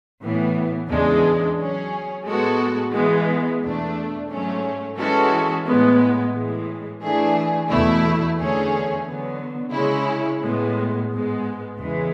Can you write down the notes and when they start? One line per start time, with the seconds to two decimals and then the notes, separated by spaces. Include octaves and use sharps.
0.22 A2 E3 B3
0.90 E2 C#3 G#3 D4
1.58 F#3 C#4 G#4
2.26 A2 G#3 B3 F#4 A4
2.94 E3 G#3 B3
3.62 E2 B2 A3 D4
4.31 G#2 F#3 A3 C#4
4.97 E3 G#3 C#4 F#4 A4
5.66 A2 G#3 B3
6.34 A2 E3 G#3
7.02 E3 A3 D4 G#4
7.69 E2 B2 A3 E4
8.38 E2 D3 A3 C#4 G#4
9.06 D3 F#3 B3
9.74 C#3 G#3 C#4 E4
10.42 A2 G#3 B3
11.10 G#2 G#3 B3
11.78 E2 C#3 E3 G#3